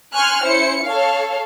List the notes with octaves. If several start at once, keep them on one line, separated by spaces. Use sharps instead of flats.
G#5 C6 C#6 F6 F#6
C#4 E4 C5 C#7
A4 C#5 F5